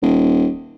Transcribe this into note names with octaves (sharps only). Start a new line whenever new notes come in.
D#1